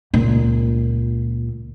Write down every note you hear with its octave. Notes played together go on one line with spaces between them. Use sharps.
C#2 A#2